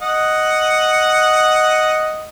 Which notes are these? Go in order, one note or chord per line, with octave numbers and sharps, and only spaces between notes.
D#5 F#5